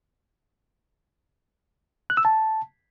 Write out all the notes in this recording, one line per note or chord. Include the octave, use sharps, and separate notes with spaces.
F#6
E6
A5